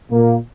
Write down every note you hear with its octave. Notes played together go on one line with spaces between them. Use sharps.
A#2 A#3